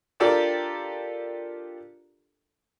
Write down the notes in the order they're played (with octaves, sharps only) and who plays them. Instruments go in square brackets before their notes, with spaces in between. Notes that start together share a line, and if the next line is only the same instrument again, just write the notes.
[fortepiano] D4 F4 G4 A4 A#4 D5